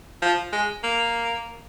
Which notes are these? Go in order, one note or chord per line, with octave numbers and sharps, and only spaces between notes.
F3
G#3
A#3